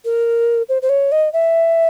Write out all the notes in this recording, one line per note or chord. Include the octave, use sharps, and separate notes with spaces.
A#4
C5
C5
C#5
D#5
E5